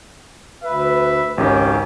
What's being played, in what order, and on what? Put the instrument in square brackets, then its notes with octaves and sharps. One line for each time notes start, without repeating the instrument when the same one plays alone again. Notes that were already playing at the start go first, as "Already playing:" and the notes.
[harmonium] D2 B4 [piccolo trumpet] E5
[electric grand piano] G#1 C#2 D#3 [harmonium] C#4 [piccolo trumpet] G4